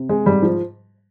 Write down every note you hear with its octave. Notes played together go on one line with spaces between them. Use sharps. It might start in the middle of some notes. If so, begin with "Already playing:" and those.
Already playing: C3
G#3
G#2 G3
F3